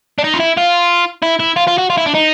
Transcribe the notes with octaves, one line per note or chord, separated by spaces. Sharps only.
D4
D#4
F4
E4
F4
E4
E4
F4
F4
F#4
F4
E4
D4
D#4